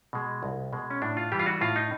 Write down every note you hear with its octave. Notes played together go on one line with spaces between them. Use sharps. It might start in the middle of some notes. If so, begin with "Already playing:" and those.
B2 G#3
C2
B2 G#3
C#4
A2 D4
F4
E3 G3 G4
F4
F#4
A2 F4
D#4